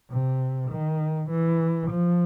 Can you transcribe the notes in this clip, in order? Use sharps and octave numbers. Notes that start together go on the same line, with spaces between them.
C3
D#3
E3
F3